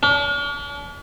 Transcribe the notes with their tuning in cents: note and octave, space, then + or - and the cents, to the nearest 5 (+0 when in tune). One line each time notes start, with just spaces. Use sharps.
D4 -45